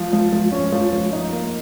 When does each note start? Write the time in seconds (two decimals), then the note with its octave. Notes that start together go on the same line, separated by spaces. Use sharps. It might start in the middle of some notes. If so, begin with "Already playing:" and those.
Already playing: F3
0.13 F3
0.33 F3
0.52 C#4
0.72 F3
0.92 F3
1.13 D#4
1.32 A#3